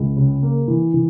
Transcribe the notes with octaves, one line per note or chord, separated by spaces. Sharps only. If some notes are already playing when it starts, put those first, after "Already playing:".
Already playing: C#2
C#3
A#3
E3
E3